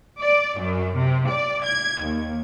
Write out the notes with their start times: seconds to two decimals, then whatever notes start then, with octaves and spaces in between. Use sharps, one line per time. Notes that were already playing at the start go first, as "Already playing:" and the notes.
0.19 D5
0.59 F#2
0.95 C3
1.29 D5
1.64 G#6
2.02 D#2